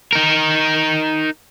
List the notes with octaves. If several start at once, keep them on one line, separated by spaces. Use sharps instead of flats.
D#4 A#4